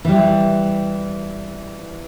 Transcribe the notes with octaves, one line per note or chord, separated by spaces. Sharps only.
E3 G3